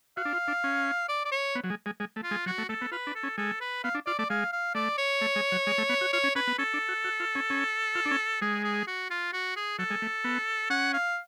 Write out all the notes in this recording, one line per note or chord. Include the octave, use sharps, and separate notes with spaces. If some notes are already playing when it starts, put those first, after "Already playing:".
F#4 F5
D4
F4
D4
C#4
D5
D5
C#5
B3
F#3
G#3
G#3
G#3
A3
F4
G#3
F#3 F#4
A3
A3 A4
B3
F4 B4
D4
A4
C#4
G#3 A4
B4
B3 F5
D4
F4 D5
A3 D5
G#3 F5
F5
A3 D5
C#5
A3
G#3
F#3
G#3
A3
B3
F#4
F4 C#5
C#4
C#4 B4
B3
C#4 A4
D4
F#4
F#4
F4
C#4
C#4
F4
D4
C#4
G#3 G#4
G#4
F#4
F4
F#4
G#4
F#3 A4
G#3
A3
B3
C#4 F#5
F5